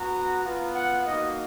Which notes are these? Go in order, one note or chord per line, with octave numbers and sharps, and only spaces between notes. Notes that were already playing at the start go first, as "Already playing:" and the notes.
Already playing: B3 F#4 A#5
B3 F4
F#5
A#3 D#4 F#4 D#5